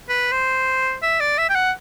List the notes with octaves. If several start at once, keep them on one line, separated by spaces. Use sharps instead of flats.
B4
C5
E5
D5
E5
G5
F#5